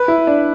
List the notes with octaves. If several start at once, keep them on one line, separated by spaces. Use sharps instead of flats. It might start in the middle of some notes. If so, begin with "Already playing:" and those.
Already playing: B4
E4
D4